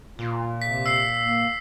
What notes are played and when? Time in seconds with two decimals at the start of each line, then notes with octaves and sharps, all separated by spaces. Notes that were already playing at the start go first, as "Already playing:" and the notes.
0.19 A#2 F4
0.62 C3 B6
0.86 E6 C7
1.22 A#3